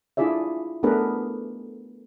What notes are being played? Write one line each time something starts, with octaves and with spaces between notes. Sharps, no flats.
D4 E4 F4 G#4 D5 E5
A3 B3 D4 G#4 A#4 B4